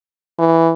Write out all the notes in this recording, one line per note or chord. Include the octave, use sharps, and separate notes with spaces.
E3